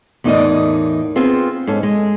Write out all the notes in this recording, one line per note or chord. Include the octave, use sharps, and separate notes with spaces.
E2 A2 D#4 A#4 D5 D#5
B3 C4 F4 G#4
G#2 C#4 A4
G#3